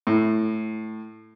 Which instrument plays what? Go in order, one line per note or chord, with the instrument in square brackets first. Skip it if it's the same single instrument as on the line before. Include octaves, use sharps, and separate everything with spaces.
[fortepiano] A2